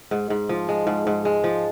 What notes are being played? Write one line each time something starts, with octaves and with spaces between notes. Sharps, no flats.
G#2
G#2
F3
G#3
G#2
G#2
G#3
F3